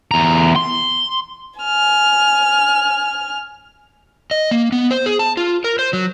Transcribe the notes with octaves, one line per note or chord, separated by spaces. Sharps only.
E2 A#5
C6
G#5 F6
D#5
A#3
B3
C5
G#4
A5
F4
A#4
C5
F#3